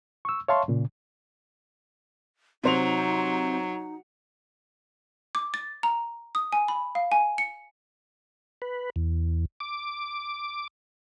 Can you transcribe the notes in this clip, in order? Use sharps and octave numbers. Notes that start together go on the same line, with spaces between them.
C#6 E6
C#5 E5 F5 A5 C6 C#6
A#2 C#3
C3 F#3 D#4 C5 F7
D6
A6
A#5
D#6
G#5
B5
F5
G#5
C#7
B4
E2
D6